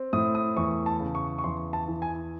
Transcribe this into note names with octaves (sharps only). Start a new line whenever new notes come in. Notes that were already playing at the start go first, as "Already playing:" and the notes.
Already playing: C4
A2 D#6
D#6
E2 C#6
A5
C#3
C#6
C#6
E2 C6
A5
E3
G#5